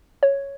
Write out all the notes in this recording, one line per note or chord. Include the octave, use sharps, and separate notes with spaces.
C#5